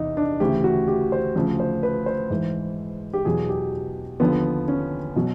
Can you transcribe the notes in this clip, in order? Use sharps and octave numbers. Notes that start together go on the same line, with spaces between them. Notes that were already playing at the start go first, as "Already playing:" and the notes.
Already playing: E2 C3 E3 D#4
D4
D2 C#3 E3 G4
F#4
G4
C5
D2 C#3 F3
C5
B4
C5
G#2 E3
G4
E2 B2 F#3 G#4
G4
D#2 D3 F3 B3
C#4
B2 F#3